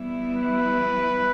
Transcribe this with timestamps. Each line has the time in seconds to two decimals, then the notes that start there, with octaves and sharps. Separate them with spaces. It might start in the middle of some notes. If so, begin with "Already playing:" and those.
Already playing: E3 G3 B3 E4
0.36 B4